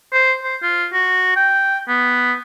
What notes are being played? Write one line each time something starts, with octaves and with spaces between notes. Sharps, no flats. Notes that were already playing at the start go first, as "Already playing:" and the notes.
C5
C5
F4
F#4
G5
B3